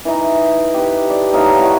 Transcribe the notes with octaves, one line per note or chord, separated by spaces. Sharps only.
E3 D#4
G4 B4
A4 D5
A2 D#4 F5
E4 F#4 C#5